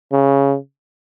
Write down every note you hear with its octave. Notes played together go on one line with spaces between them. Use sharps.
C#3